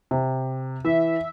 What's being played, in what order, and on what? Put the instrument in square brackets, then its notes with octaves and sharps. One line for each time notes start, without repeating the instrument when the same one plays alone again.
[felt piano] C3
[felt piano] E3 [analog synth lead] E5